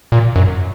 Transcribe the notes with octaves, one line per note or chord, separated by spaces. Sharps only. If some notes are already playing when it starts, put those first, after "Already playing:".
A#2
F#2